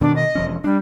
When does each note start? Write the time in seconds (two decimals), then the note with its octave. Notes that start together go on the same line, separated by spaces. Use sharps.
0.01 B2 D#3 D4
0.16 D#5
0.35 E1 F3 C#4
0.64 G3 D4